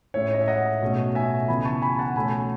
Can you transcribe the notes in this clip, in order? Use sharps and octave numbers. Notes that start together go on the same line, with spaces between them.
A2 G#3 C#4 C#5 E5
D#5
E5
D#5 F#5
B2 A3 C#4
E5 G#5
C#3 E3 B3 G#5 B5
A5 C#6
G#5 B5
F#5 A5
B2 A3 C#4 G#5 B5